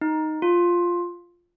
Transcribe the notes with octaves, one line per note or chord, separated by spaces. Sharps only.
D#4
F4